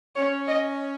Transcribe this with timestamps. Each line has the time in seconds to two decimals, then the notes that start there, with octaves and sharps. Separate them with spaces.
0.15 C#4 C#5
0.48 D#5